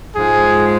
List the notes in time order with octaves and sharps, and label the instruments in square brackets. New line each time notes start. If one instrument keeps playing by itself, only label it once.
[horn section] G#2 F3 G#3 G#4